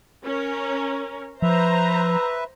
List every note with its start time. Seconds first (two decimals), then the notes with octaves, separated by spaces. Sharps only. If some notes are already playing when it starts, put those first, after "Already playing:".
0.24 C#4 A#4
1.42 F3 B4 C5 E5 A#5